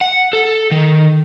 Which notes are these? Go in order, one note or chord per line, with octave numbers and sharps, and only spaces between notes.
F#5
A4
D#3